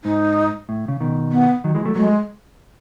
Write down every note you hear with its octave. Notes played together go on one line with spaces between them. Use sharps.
G#2 D#4
A2
C#3
B2 D#3
B3
D#3 F#3
E3 G#3
F#3 A3
F#3 G#3 A3